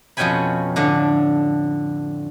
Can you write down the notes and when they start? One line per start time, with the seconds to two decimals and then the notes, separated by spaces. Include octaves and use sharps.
0.17 F2 B2 C#4 G5 G#5 B5
0.76 A2 D3 D4